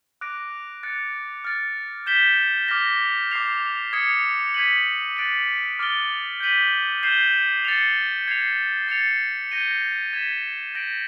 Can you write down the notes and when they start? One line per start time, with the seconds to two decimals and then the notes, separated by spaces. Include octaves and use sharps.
0.21 D6 F#6 A#6 D7
0.83 F#6 A6 C#7
1.45 F6 A6 D7
2.06 G6 B6 E7 G7
2.68 D6 F6 A#6
3.31 D6 G6 C7 F7
3.93 D#6 G#6 C#7
4.54 G#6 B6 D#7 F#7
5.17 F#6 A6 D7 F#7
5.79 D6 F6 A6 D7 G7
6.40 G6 B6 D#7 F#7
7.03 G6 C7 E7 G7
7.65 A6 C#7 F7
8.28 G#6 C7 F7
8.88 A6 C#7 F7
9.51 G6 A#6 D#7 G7
10.13 G#6 B6 E7
10.74 G6 A#6 D7 F#7